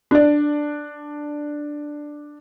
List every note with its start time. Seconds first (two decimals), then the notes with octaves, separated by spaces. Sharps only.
0.11 D4 D5